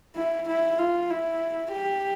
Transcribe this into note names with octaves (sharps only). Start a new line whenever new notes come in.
E4
E4
F4
E4
G4